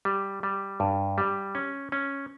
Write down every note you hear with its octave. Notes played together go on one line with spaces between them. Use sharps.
G3
G3
G2
G3
C#4
C#4